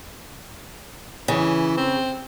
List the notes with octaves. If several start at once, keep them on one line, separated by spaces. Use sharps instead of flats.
C#3 E3
C4